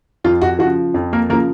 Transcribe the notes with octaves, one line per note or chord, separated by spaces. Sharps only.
F2 F4
F#4
F3 F#4
C#3
F2
A#3 A#4
C#3 F3 A#3 A#4